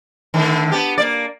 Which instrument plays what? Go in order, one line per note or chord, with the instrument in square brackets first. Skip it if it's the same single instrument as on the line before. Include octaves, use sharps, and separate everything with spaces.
[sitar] A2 D3 D#3
B3 G4
A#3 D5